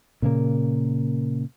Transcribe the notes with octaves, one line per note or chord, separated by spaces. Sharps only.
A#2 C#3 A#3